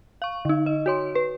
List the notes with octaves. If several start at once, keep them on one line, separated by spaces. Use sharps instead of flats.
F5 C#6
D3 D#4
D#5
F#4 C#5 C6
B4